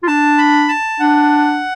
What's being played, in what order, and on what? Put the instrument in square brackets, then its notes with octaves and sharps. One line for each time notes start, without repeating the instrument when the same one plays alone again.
[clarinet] F4
[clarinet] D4 [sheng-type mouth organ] A5
[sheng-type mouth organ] B5
A5
[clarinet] D4 [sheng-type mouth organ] F#5